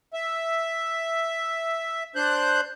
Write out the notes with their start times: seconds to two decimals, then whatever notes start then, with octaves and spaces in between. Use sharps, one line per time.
0.14 E5
2.16 D4 C5 F#6 G6